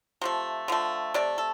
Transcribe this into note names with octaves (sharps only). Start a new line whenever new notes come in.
C3 F3 A3
D3 F3 A3
C3 A3 D5
A4